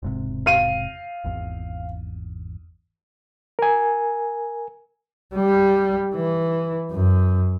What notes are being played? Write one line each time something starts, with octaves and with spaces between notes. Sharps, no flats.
E1 G#2 C3
F5 D#7
G#1 E2
A#4 G#5
G3
E3
F#2